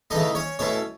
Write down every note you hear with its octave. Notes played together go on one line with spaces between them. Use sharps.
C#3 E3 A3 D#4 D#5
C#4 C#5
B2 A3 C#4 E4 C#5